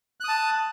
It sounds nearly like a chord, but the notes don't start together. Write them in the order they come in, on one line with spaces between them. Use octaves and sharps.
F#6 D#6 A5